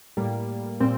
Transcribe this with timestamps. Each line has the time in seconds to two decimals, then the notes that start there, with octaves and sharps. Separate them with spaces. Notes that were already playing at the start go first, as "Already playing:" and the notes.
0.17 A2 G3 A#3
0.80 A#2 G3 C4